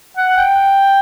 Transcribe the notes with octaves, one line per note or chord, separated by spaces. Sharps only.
F#5
G5